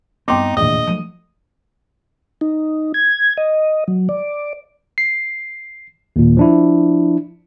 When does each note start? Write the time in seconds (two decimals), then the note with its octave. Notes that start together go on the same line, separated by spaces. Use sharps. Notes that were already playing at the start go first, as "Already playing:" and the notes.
0.28 G2 B3 C4 D#4 G5 C6 D6
0.57 E1 A#1 D#2 A2 D#5
0.87 F3 F#3 A3 D#7
2.41 D#4
2.94 G#6
3.37 D#5
3.88 F#3
4.09 D5
4.98 C7
6.16 D#2 A#2
6.37 F3 D4 E4